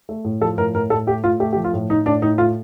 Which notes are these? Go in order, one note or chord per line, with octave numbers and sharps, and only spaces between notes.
A3
A2
F3 A4
A2 A#4
A2 A#4
A2 A4
A3 G4
A2 F4
A3 G4
G4
F3
F4
A2
A2 D#4
A2 D4
A2 D#4
A3 F4